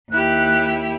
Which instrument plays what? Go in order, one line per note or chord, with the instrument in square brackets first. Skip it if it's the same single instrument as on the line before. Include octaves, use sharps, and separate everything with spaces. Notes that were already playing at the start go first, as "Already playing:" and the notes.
[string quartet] D#2 E4 G4 [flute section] F#6